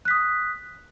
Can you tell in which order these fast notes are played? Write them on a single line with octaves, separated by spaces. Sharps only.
F#6 B6 D#6